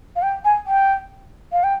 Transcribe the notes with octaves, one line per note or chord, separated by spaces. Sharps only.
F5
G5
G#5
G5
F5
G5